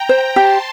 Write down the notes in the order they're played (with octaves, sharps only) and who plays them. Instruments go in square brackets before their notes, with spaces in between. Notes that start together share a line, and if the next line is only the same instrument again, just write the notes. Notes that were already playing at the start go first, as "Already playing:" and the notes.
Already playing: [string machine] G5 A#5
[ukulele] C5
[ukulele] G4 [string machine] A5 C6